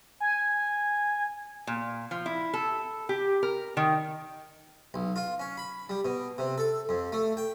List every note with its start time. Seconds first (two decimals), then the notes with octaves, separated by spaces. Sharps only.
0.20 G#5
1.67 A#2
2.11 F3
2.26 E4
2.54 A4
3.09 G4
3.43 A#4
3.77 D#3
4.94 B1
5.16 F4
5.39 C#4
5.57 B5
5.89 G3
6.05 B2
6.38 C3
6.58 A4
6.89 F2
7.12 A3
7.37 G5